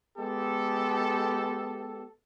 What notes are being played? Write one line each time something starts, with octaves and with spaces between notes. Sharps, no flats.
G#3 B3 G4 A4